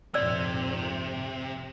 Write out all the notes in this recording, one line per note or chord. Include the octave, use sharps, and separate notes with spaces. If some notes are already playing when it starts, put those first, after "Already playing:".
A#1 F2 G#2 C3 D5 E6